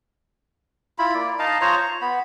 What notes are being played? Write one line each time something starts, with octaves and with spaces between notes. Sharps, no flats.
E4 F4 B5
A#3 D5
D#4 D#5 F5 A5
F4 C5 C#5 A#5
F4
B3 B5